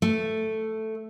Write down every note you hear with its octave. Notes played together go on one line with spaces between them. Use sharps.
A3